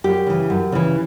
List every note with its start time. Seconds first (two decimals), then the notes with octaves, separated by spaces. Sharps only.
0.04 F#2 G4
0.27 C#3 E3
0.50 F#2
0.72 C#3 E3